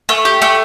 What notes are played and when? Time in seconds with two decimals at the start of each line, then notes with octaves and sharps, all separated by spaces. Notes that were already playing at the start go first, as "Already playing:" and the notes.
0.09 A3
0.25 G4
0.42 A3